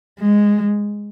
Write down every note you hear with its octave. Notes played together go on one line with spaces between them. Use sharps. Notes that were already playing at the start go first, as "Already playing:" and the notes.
G#3